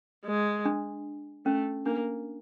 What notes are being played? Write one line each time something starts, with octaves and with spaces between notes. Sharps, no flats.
G#3
D4
A3 C#4
A#3 D4